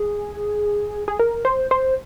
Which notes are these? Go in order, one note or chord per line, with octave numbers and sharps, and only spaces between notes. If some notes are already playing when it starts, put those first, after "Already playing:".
Already playing: G#4
G#4
A#4
C5
C5